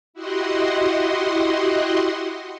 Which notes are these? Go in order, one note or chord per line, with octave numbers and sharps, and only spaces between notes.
E4 F#4 G4 D#5 F#5 C6